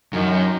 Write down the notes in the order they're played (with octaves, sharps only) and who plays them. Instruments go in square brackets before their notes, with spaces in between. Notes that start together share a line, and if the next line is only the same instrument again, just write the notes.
[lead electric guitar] F#2 [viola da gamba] D#3